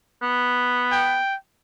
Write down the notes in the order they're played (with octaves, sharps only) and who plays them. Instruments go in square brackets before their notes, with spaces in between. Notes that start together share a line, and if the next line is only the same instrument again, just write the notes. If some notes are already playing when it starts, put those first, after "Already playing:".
[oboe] B3
[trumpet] G5